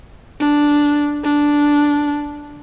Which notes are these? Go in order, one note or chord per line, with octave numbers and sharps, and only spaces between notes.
D4
D4